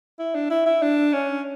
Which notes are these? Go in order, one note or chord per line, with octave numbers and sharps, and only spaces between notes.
E4
D4
E4
E4
D4
C#4